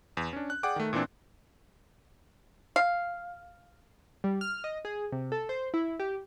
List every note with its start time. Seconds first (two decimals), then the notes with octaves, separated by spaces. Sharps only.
0.17 E2
0.33 C#4 D4
0.50 F#6
0.63 G#4 D5 F#5 G5 D6
0.76 D#3 A3
0.93 A#2 E3 C4 D4
2.76 F5
4.24 G3
4.41 F6
4.64 D#5
4.85 G#4
5.12 C3
5.32 A4
5.49 C5
5.74 E4
6.00 G4